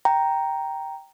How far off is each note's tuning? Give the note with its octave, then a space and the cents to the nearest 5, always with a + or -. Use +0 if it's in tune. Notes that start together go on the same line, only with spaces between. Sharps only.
G5 -5 A#5 +0